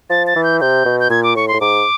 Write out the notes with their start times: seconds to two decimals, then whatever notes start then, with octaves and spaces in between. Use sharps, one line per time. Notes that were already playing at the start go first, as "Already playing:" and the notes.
0.10 F3 A6
0.27 A6
0.36 E3
0.44 G6
0.61 C3 G6
0.86 B2
1.00 G6
1.10 A#2 G#6
1.23 D6
1.36 A2 C#6
1.48 C6
1.54 A2
1.61 G#2 D6